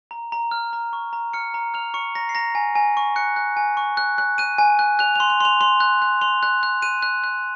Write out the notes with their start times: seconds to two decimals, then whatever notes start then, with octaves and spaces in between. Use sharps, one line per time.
0.11 A#5
0.32 A#5
0.51 F6
0.73 A#5
0.93 C#6
1.13 A#5
1.33 F6 C#7
1.54 A#5
1.74 F6 F7
1.94 C#6 C#7
2.15 A#5 A#6
2.29 C7
2.35 A#5 A#6
2.55 G#5
2.75 G#5
2.97 C#6
3.16 F#6 C#7
3.36 F#6
3.57 G#5
3.77 C#6
3.97 F#6
4.18 F#6
4.38 F#6 D#7
4.58 G#5
4.79 F#6
4.99 F#6 F7
5.15 C6 F7
5.30 F7
5.41 C6 F7
5.61 C6 F7
5.80 F#6
6.02 F#6
6.21 C6 F7
6.43 F#6
6.63 F#6
6.82 F#6 D#7
7.02 F#6
7.24 F#6